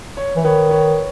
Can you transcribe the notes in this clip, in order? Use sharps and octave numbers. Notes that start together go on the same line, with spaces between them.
C#5
E3
D#3 B4 C#5
B4 C#5